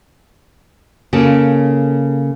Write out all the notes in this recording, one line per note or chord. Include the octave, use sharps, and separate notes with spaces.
C#3 A#3 A4